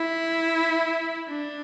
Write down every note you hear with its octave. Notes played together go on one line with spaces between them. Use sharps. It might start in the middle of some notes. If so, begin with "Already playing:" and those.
Already playing: E4
D4